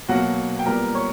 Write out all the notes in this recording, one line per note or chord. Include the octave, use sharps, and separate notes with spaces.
B2 F#3 A#3 F#4 F#5
G5
A#2 G3 B3 A#4 A#5
C#5 C#6